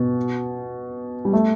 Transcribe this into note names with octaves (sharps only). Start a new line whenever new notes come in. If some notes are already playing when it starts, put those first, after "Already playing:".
Already playing: B2
G3
A3